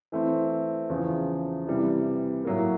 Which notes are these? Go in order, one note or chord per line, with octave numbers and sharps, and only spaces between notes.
E3 A3 C4
E2 C#3 F3
C3 E3 G3
A2 F#3 A#3